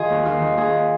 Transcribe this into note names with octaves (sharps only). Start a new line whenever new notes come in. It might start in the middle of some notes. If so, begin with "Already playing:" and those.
Already playing: D#3 F4 G#4
D#2
D#3 F4
D#3
D#2 G#4